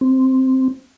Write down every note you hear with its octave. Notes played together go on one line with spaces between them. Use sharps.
C4